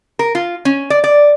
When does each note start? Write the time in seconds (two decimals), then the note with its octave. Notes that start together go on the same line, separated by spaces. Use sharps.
0.19 A#4
0.35 F4
0.65 C#4
0.90 D5
1.04 D5